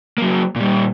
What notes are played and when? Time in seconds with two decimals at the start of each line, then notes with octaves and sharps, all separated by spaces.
0.18 F#3 A#3
0.56 A#2 G3